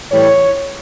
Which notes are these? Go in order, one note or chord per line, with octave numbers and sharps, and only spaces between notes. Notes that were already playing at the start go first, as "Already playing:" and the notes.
A2 E3 G3 C#5